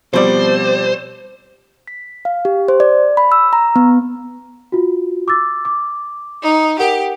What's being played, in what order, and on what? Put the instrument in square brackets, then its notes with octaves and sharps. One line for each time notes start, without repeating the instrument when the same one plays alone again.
[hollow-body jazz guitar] B2 G3 [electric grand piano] F3 C4 D5 [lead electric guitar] C5
[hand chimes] B6
F5
G4
C5
D5
B5
E6
A#5
B3
[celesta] F4 F#4
D6 E6 A6
D6
[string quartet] D#4
[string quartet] G4 [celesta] A#4 F#5